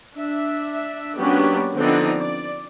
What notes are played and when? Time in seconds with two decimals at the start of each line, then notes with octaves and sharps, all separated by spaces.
0.16 D4 E5
1.18 F#3 A#3 B3 C#4 D4 G4
1.77 D3 F3 B3 C4 D4 D#4
2.21 D5